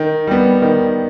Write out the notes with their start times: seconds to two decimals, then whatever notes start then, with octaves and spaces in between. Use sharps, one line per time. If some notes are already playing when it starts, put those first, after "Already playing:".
Already playing: D#3
0.27 G3 B3
0.62 D#3